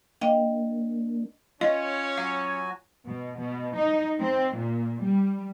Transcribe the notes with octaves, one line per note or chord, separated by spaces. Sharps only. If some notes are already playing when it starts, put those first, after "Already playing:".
A#3 D4 D#5 F5 G5
C#4 F4 C#5 D#5
F#3 F#4 F5 G#5
B2
B2
D#4
C4
A#2
G3